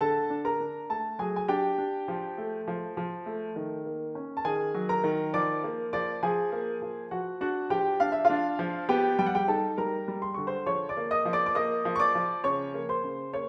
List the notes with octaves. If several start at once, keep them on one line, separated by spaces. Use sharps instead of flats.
D3 A4 A5
D4
A#4 A#5
D4
A3 A4 A5
F#3 G#4 G#5
G#5
D4 G4 G5
D4
F3
A3
F3
F3
A3
D#3
A#3
C#4
A5
D#3 G#4 G#5
F#3
A#4 A#5
D#3
F3 D5 D6
A#3
F3 D5 D6
F3 G#4 G#5
A#3
F3
F3 F#4 F#5
D4 F#4 F#5
F3 G4 G5
D4 F5
E5
F4 F5
D4
F3
B3 G4 G5
G3 G5
F#5
G4 G5
D#4 A4 A5
G3 A#4 A#5
G3
C6
D3 C#6
C5 C6
F3 C#5 C#6
D5 D6
A#3
D#5 D#6
F3
D5 D6
D6
A#3 D#5 D#6
F3
C#6
D5 D6
F3
C#3 C#5 C#6
A#3
C5 C6
C#3
A#3 C#5 C#6